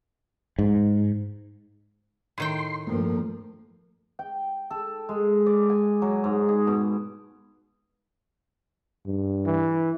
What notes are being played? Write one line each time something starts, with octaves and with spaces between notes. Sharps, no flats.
G#2
A2 D#3 G5 C6
G2 F3 A3 A#3
G5
A4
G#3
D5
G#5
F#3
G#2
G#4
B2
G2
E3